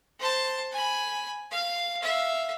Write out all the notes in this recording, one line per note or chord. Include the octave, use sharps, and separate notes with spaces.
C5 A5
G#5 B5
F5
E5 F5